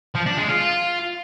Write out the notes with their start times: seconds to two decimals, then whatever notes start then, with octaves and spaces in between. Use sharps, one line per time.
0.15 F3
0.26 D4
0.38 G#3
0.49 F4